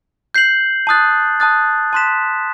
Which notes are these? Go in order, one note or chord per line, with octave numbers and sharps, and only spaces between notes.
G6 C7 F#7
A5 D#6 F#6 A6
A5 D#6 F#6 A6
A5 C6 F#6 B6 E7